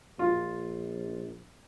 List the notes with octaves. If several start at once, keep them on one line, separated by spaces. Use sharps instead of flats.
A#1 F4